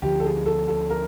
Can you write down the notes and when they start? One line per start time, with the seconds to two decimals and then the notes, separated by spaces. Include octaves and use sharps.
0.02 D2 D3 F3 G4
0.20 A4
0.25 G#4
0.46 A4
0.68 A4
0.90 A#4